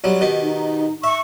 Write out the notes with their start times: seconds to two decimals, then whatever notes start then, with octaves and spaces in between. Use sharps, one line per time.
0.04 B1 F#3 G3
0.21 B2 D#3 G4
0.42 D#4
1.04 E5 C#6